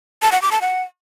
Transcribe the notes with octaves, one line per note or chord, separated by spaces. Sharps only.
A5
F#5
D6
A5
F#5